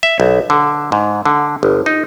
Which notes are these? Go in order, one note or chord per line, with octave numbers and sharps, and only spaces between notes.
E5
B1
D3
G#2
D3
G1
D#4